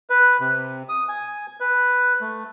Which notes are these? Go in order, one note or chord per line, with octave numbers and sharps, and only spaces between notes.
B4
C3
D#6
G#5
B4
A3